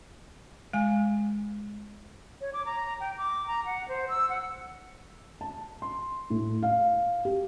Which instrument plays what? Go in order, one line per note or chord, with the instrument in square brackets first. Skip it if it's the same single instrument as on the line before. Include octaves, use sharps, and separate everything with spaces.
[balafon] G#3 G#5
[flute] C#5
D6
A#5
G5
D6
A#5
F#5
C5
E6
F#5
[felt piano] A5
C6
A2
F5
G4